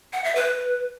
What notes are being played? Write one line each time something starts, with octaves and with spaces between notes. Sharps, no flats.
F#5
E5
B4